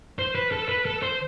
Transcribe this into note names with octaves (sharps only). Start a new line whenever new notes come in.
C5
B4
A4
B4
A4
C5